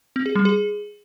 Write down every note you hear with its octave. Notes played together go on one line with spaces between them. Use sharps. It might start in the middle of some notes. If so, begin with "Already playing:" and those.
C4
G#4
G3
G#4